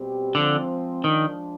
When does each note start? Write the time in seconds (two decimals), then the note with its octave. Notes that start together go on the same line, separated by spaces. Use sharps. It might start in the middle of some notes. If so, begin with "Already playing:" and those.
Already playing: B2 G3 C4 G4
0.34 D3 F3 G#3 C4
1.04 D#3 F3 G#3 D4